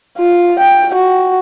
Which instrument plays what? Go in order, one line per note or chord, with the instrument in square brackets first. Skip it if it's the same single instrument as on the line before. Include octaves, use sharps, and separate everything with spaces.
[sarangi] F4
G5
F#4